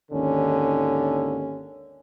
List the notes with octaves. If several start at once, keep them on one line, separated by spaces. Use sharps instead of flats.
G#1 D#2 D3 C#4